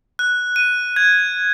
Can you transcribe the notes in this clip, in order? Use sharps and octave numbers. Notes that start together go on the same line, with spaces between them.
F#6
D#7
G#6